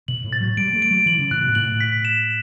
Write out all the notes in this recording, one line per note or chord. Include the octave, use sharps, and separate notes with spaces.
B2 F#7
A2
A6
F#3
G3 D7
A3
D7
F#3
E3 F#7
C#3
A2 F#6
B2
A2 F#7
B6
E7